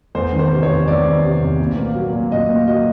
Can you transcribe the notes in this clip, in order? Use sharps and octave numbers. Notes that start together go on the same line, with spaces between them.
E2 C5
D#3
C5
C3
C#5
E2
E2 D5
D#3
C3
E2
A#2
A#3
F#3
A#2
A#2 D#5
A#3
F#3 D#5